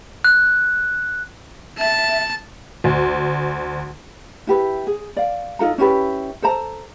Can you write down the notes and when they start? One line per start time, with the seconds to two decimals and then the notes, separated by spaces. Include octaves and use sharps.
0.24 F#6
1.78 E5 A5
2.84 D2
4.47 E4 G4 B4
4.87 G#4
5.17 D5 F5
5.59 D#4 F4 A4 A#5
5.78 C#4 E4 G4 B4
6.42 A4 C5 A5 A#5